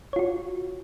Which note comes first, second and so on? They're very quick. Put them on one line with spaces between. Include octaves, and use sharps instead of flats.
C#5 F4 F#4